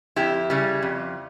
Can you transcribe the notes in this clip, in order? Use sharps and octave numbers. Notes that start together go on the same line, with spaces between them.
F2 E4 G4
C#3 G3
F2